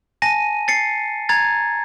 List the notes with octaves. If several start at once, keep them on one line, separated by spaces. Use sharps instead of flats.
G#5 A5 A#6 D#7
A6 C7 C#7
A#5 G#6 A6